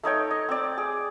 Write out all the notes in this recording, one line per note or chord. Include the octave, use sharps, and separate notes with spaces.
A3 D#4 C#5 G5
D#5
C4 D5
G#4